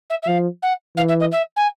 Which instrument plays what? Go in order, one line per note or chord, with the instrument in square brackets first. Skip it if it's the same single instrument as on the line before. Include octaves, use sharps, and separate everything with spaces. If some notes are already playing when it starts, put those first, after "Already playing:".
[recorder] E5
E5
[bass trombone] F3 [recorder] F5
[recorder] F#5
[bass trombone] E3 [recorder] F5
[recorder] E5
D#5
E5
G#5